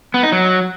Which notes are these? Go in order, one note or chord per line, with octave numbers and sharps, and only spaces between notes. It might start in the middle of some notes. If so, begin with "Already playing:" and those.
B3
D#4
F#3